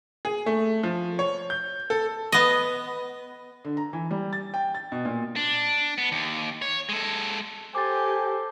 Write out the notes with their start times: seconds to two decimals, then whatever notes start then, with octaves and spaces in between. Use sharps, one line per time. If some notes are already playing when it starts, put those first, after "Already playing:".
0.25 G#4
0.46 A3
0.83 F3
1.19 C#5
1.50 G6
1.90 A4
2.32 B3 D#5
3.65 D3
3.77 A#5
3.93 E3
4.11 G3
4.33 A6
4.54 G5
4.75 A6
4.92 B2
5.05 A#2
5.36 D4
5.98 B3
6.12 D#2
6.62 C#5
6.89 G#3 A4
7.75 G4 A4 C5 G#5 D6 A6